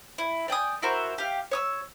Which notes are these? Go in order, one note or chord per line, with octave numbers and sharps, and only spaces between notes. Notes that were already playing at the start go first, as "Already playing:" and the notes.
E4
D5 G5 G#5 D#6
E4 F#4 A#4 C5
G4 F5
C#5 D#6 E6